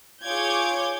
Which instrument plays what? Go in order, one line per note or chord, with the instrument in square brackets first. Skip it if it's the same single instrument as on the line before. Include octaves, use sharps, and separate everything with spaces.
[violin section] F4 G#4 C#5 D6 G6 G#6